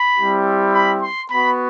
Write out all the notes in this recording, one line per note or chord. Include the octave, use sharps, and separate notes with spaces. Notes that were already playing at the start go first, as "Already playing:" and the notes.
Already playing: B5
G3 C4 E4 G4
B5
C6
B3 F#4 B5